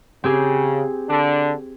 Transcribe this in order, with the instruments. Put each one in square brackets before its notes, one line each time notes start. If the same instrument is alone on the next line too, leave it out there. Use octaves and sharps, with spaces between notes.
[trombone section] C#3 [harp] C4 G4 G#4
[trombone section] D3 D4